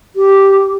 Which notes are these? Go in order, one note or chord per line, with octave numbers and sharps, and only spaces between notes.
G4